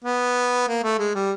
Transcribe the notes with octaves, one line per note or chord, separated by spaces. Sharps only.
B3
A#3
A3
G#3
G3